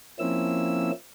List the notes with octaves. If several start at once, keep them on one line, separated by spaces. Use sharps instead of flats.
F3 A#3 C4 C#4 E4 E6